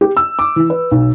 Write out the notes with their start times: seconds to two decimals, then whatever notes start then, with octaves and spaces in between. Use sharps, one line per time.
0.01 G4
0.17 E6
0.39 D6
0.56 E3
0.70 B4
0.91 B1